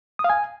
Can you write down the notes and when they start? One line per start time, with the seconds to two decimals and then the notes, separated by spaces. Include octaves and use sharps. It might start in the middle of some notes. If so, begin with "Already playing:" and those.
0.19 D#6
0.24 F5
0.30 G#5